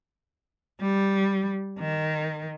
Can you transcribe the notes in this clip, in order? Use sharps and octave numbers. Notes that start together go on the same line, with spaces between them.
G3
D#3